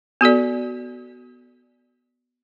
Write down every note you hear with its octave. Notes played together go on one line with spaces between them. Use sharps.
B3 F#4 A4 D5